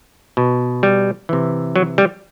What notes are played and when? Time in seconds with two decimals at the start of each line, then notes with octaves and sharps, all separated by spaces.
0.37 B2
0.83 G3
1.29 C3 E3
1.76 F#3
1.98 G3